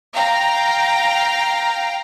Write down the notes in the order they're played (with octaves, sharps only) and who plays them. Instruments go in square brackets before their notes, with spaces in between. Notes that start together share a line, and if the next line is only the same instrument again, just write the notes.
[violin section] F5 G5 A#5